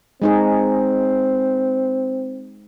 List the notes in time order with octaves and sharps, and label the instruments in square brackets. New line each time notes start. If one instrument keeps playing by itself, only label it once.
[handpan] G#3 D#4 G#4 [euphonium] C4